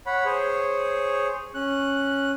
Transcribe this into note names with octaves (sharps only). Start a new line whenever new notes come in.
C#5 F#5 B5
G#4 C5 C#5
C#4 F#6